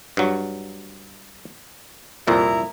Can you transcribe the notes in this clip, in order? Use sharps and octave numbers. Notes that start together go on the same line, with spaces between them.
G2 F#3
C2 F2 A#2 E4 A#5